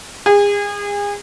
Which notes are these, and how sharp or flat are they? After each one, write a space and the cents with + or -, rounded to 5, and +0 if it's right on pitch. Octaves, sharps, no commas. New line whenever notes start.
G#4 -35